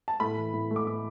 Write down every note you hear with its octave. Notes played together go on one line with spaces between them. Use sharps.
A5
A2 B5
E3
A2
A3
D6
A2 D6